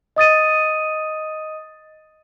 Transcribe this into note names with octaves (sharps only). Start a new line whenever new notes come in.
D#5 D#6 A6 D#7